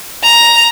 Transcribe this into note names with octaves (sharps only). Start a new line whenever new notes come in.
A#5